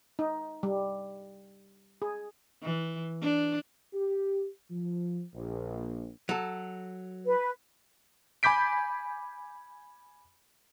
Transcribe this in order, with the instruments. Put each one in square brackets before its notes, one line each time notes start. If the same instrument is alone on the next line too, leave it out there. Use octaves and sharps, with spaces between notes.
[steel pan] D#4
G3
G#4
[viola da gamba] E3
D4
[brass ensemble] G4
F3
A#1
[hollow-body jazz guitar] F#3 A4
[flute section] B4
[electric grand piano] G#5 B5 D6 G6 B6 D7